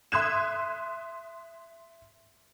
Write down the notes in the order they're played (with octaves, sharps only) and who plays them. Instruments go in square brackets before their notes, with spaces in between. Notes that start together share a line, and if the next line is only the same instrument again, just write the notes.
[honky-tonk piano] E5 C6 D#6 F#6 G#6 E7